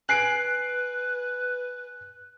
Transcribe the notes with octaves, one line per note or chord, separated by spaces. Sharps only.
B4 G#5 F#6 C7 D7